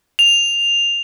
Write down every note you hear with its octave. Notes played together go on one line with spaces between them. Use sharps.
F7